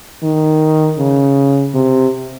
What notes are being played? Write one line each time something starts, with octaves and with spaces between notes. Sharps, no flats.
D#3
C#3
C3